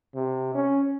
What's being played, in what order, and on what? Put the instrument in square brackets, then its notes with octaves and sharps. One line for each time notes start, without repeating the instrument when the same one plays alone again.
[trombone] C3
C#4